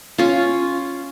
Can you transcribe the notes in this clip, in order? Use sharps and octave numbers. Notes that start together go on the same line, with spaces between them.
C#4 F4